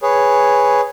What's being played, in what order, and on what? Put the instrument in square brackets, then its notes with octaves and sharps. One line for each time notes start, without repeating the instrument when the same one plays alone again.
[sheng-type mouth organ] G#4 B4 C#5